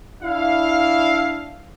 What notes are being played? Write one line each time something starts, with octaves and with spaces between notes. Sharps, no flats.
D4 E4 F5